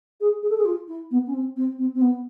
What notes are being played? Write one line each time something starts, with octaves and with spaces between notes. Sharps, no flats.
G#4
G#4
A4
G#4
F4
E4
B3
C#4
C4
C4
C4
C4
B3